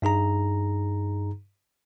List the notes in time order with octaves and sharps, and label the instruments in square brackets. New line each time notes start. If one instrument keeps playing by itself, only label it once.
[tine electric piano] G2 D#4 G#4 A#5